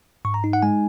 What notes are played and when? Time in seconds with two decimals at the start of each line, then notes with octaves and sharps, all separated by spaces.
0.25 G#2 C#6
0.34 A#5
0.44 D#4
0.53 F#5
0.62 G#3 G#5